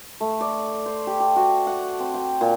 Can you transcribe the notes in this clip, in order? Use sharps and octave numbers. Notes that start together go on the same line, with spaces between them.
A3
D5
C5
G4
G4
F#4
F#5
C4
G5
A#2